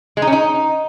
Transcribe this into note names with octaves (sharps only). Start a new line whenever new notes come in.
G#3
D#4
C#4
D#4